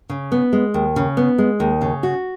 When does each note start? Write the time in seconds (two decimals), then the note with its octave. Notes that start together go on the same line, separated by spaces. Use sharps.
0.09 C#3
0.32 B3
0.53 G#3
0.74 D#2
0.96 C#3
1.17 B3
1.38 G#3
1.60 D#2
1.82 C#3
2.03 F#4